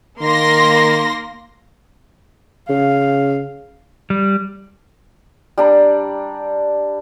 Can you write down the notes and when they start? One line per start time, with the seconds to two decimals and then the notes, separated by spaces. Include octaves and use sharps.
0.22 D#3 A#3 C6 A#6
2.69 C#3 F5
4.10 G3
5.58 G3 D4 A#5